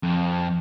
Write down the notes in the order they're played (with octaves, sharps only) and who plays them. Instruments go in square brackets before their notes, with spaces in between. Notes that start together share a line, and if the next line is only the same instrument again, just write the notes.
[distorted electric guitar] F2